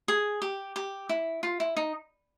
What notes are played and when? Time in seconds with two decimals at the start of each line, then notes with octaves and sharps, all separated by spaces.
0.08 G#4
0.42 G4
0.76 G4
1.09 E4
1.43 F4
1.60 E4
1.77 D#4